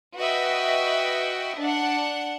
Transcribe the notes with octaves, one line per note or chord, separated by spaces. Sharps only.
F#4 B4 D#5 E5 G5
D4 F#5